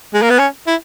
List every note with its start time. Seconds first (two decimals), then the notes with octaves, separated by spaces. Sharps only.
0.14 G#3
0.22 A#3
0.30 B3
0.39 C#4
0.67 E4